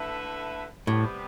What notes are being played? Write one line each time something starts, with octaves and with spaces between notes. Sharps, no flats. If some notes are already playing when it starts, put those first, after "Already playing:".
Already playing: D3 A3 E4 B4 E5
A2 C3 G3 B3